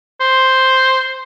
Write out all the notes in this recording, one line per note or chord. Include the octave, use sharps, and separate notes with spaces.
C5